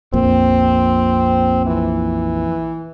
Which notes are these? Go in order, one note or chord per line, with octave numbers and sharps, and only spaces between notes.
A#1 F2 A#2 C4
E3